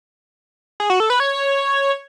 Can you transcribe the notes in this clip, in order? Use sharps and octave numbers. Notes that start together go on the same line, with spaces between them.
G#4
F#4
A4
B4
C#5